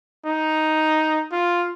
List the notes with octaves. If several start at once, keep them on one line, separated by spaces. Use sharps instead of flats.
D#4
F4